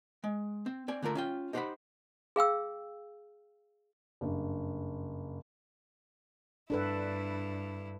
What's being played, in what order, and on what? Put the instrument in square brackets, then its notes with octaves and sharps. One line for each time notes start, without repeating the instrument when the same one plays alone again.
[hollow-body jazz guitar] G#3
C4
C4 D5 G#5
D3 A3 F4 A#4 E5
C#4 F4 G5
D#4 G4 C5 F5 F#5 B5
[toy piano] G#4 F5 G5 E6
[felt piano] F#1 G2
[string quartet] G2 E4 [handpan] D4 A4 B4